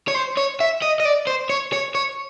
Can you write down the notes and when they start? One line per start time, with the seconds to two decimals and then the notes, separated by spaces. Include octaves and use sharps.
0.08 C#5
0.15 C5
0.37 C#5
0.61 E5
0.82 D#5
1.00 D#5
1.05 D5
1.27 C5
1.50 C#5
1.73 C#5
1.95 C#5